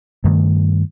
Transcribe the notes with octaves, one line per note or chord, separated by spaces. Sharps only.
G2 D#3 A3